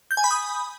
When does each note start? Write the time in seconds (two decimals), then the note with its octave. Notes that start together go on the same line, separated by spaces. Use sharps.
0.11 G6
0.17 G#5
0.24 B5
0.31 D#6